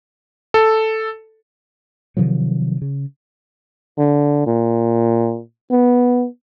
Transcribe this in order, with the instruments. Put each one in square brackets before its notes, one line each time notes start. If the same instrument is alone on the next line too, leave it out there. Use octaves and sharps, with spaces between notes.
[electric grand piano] A4
[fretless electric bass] C3 D#3 F3 F#3
C#3
[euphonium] D3
A#2
B3